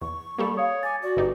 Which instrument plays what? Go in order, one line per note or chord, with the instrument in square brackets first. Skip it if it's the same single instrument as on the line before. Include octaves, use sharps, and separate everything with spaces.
[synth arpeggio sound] E2 [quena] C#6
[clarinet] G3 [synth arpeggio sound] A#3 G4 A4
[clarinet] C#5 [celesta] F5 D#6
[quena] G#5 [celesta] D6 A6
[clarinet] F#4 [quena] D5
[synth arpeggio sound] G1 D#4 G4 [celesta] B4